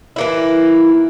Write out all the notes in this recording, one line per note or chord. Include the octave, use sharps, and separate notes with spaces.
E3 A#3 E4